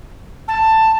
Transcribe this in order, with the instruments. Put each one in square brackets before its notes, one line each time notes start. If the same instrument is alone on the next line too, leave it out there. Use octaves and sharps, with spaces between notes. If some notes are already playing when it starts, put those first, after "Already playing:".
[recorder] A5